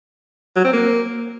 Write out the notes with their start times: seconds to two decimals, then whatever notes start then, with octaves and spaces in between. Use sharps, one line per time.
0.56 F#3
0.65 C4
0.73 A#3